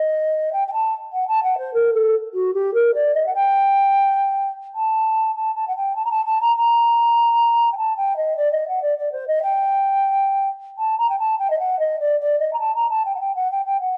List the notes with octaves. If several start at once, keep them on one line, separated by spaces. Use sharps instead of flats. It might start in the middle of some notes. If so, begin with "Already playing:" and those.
Already playing: D#5
G5
G5
A5
F#5
A5
F#5
C5
A#4
A4
F#4
G4
A#4
D5
D#5
F#5
G5
A5
A5
A5
F#5
G5
A5
A#5
A5
A5
A#5
A#5
G5
A5
G5
D#5
D5
D#5
F#5
D5
D5
C5
D#5
G5
A5
A#5
G5
A5
G5
D#5
F#5
D#5
D5
D5
D#5
A#5
A5
A#5
A5
G5
F#5
G5
F#5
G5
G5
F#5